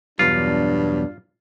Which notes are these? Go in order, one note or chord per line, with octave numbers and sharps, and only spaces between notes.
E2 G2 B2 F#3 D4 F4